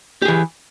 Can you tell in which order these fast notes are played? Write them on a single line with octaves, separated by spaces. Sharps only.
G4 G#4 E3